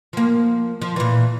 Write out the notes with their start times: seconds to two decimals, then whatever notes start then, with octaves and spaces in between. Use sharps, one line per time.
0.13 F3 A#3
0.82 F3
0.96 A#2 E3